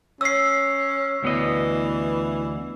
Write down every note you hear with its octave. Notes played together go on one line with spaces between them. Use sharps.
C#4 E6 C7
D2 E3 B3 D#5